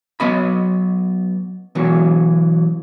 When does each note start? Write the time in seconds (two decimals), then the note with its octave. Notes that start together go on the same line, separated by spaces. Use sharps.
0.20 F#3 B3 D#5 B5
1.75 B2 E3 F#3